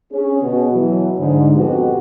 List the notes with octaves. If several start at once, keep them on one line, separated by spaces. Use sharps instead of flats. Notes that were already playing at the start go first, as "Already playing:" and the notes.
C#4 G#4
B2
B2 E3 F#3
G#2 D3
F2 B2 F#4 G4 B4